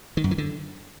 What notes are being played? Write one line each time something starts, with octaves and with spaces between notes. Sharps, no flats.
D#3
F#2
E3
D3